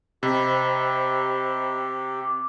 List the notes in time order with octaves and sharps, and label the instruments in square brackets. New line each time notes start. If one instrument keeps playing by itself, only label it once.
[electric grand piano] C3 [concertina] G4 [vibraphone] C5 D#5 B5
[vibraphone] D6